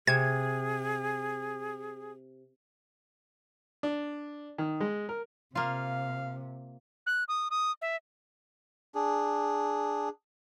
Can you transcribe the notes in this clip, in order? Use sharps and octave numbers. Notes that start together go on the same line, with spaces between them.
C3 G#4 G#6
D4
D#3
G#3
A#4
C3 A#3 F4 F5
F#6
D#6
D#6
E5
D4 G#4